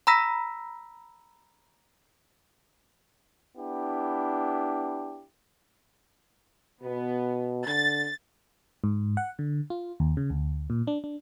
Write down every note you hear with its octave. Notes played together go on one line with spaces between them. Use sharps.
A#5 B5 E6 A#6 B6
B3 D4 E4 G4
B2 B3
D3 A6
G#2
F#5
D3
F4
D#2
C#3
D2
A#2
D4
D4